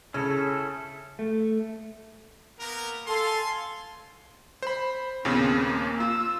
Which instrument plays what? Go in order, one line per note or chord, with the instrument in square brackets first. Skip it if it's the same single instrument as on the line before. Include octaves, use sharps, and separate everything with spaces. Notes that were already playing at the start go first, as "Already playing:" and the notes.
[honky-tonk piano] C#3 [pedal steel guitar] C#4 E4 A4
[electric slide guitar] A3
[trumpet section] A#3 B3 A#4
[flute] A4 [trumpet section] F5 G#5 C6
[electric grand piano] C5 B5
[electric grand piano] D#2 A#2 C#3 [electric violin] B3 C4
[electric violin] A#3
[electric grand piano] F4 [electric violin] E6